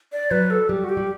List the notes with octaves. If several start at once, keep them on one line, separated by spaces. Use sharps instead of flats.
D5
F#3 B4
A4
G3 G4
F#4
G4
G3